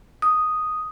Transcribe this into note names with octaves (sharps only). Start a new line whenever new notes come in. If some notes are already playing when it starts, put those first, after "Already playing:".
D#6